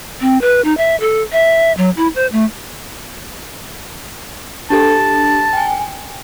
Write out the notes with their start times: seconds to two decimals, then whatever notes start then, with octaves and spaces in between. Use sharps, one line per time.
0.21 C4
0.41 B4
0.64 D#4
0.77 E5
1.00 A4
1.32 E5
1.77 F#3
1.97 E4
2.15 C5
2.32 A3
4.70 D4 G4 A4 A5
5.53 G5 G#5